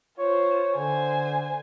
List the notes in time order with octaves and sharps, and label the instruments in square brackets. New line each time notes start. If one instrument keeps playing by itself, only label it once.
[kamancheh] F4 C5 [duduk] C#5
[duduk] D3 [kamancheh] C5 G#5